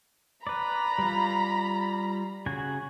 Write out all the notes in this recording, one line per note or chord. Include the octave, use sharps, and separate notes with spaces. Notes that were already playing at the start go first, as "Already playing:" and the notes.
B4 D5 A#5 B5
G3 F4
C#3 F#4 G#5